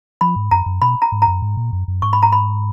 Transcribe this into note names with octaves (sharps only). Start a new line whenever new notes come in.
F3 B5
G#2
F#2 A#5
F#2
B2 B5
A#5
G#2
A#5
F#2
G#2
A#2
F#2
F#2
G#2 C#6
B5
A#5
B5